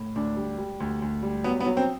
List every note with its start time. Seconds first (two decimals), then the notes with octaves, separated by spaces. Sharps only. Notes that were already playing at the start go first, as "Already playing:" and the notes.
Already playing: A2
0.15 D2 D4
0.37 G3
0.58 G3
0.80 D2
1.02 D2
1.23 G3
1.44 F#3 B3
1.60 B3
1.66 F#3
1.77 C4